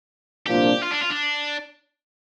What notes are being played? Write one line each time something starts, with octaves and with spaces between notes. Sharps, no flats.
C2 A#2 F3 A#3 D4 G4
F4
D4
F4
D4